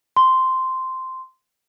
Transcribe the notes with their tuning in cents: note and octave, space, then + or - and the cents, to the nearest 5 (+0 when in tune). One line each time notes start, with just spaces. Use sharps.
C6 -5